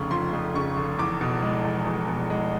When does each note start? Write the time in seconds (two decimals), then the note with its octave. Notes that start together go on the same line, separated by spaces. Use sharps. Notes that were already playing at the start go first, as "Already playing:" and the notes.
Already playing: F1 F2 C#3 C#6
0.11 F3 C6
0.33 F2
0.55 C#3 C#6
0.76 F1
0.99 E2 D6
1.21 B2
1.42 G#3
1.64 E2
1.86 E2
2.09 B2
2.30 G#3